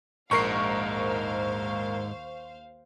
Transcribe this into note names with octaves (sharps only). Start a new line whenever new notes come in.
A#1 D#2 G#2 A#4 C5 F5 C#6 C7